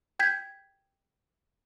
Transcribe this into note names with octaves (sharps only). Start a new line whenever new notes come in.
G5 G6 G#6 B6